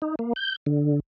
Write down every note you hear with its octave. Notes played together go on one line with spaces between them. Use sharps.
D#4
A#3
G6
D3